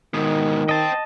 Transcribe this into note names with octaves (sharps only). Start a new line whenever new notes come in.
G#2 B2 D#3
C5 D#5 G5 A5